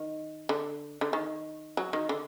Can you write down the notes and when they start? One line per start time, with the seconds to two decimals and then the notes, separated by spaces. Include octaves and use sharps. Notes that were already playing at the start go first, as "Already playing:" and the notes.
Already playing: D#3
0.49 D3
1.01 D3
1.13 D#3
1.77 F#3
1.93 D#3
2.09 D3